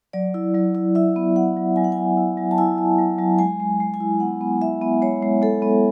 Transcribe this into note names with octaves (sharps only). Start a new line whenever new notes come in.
F#3 D5
E4
F#3
E4
E4 E5
B3
E4 F#5
F#3
F#3 G#5
F#5
F#3 G#5
E4
F#3
A5
E4 G#5
E4
F#3
F#3
G#3 G#5
G#3
G#3
G#5
E4
B3 F#5
B3
E4 E5
B3
G#3 C#5
G#3
G#3 A4
B3